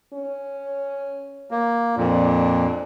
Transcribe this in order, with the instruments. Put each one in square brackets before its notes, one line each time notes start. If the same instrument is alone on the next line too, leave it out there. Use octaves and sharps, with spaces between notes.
[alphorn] C#4
[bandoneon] A#3
[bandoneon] F2 A#2 [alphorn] D4